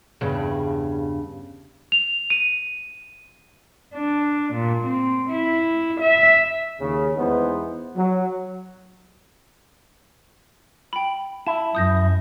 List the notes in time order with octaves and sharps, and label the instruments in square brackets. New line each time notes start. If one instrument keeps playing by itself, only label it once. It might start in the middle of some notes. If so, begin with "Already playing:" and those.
[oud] E2 G2 C#3
[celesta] F7
D#7
[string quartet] D4
A#2
C4
E4
E5
[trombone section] D#2 C#3
E2 E3 G#3 B3 D#4 C5
F#3
[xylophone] G5 B5
[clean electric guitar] E4 [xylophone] A5
[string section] F#2 [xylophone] D#6 G6 A#6